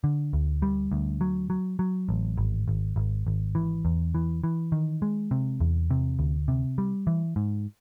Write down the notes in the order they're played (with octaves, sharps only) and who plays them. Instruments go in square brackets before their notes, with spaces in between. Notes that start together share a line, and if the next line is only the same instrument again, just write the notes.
[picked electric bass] D3
D2
G3
D2
F#3
F#3
F#3
A1
G#1
G#1
G#1
G#1
E3
E2
E3
E3
D#3
G#3
C3
E2
C3
D2
C3
G3
E3
G#2